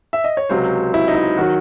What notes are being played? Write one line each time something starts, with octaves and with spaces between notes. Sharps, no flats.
E5
D#5
C#5
C#2 C3 F#3 C5
E4
D#4
E4
D#3 F#3 F#4